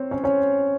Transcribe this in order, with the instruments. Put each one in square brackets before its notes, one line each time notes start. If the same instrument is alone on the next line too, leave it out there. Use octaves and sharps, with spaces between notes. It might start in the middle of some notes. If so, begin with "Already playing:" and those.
Already playing: [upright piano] C4 C5 C#5
C#4 C#5
C#4 C#5